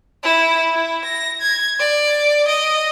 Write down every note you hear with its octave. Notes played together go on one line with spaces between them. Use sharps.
E4
E4
A#6
G#6
D5
D#5